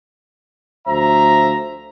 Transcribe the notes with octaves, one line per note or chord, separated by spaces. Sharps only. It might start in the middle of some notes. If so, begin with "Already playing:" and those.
D2 F3 C5 E5 A#5